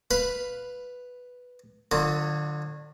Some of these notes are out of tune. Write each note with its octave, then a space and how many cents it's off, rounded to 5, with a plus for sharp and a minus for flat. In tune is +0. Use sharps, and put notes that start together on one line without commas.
B4 +0 F5 +0 B5 +10
D3 +30 F#3 -25 F4 +0